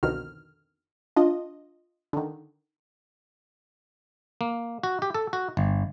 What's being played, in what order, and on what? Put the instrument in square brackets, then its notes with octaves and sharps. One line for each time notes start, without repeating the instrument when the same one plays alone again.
[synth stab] C2 F2 B2 D3 D#3 F6
D4 F4 D#5
D3 D#3
[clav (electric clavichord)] A#3
F#4
G4
A4
F#4
G1